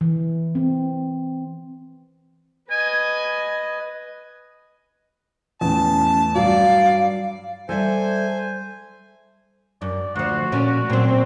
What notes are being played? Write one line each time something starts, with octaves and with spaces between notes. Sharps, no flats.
E3
C4
B4 D#5 G#5
E2 A2 C#4 A5
G2 F#3 D5 F5
G3 A4 C5 D5 E5 G#5
F#2 D5
D2 F3 F#4
A#2 C#4 D5
A#2 F#3 C4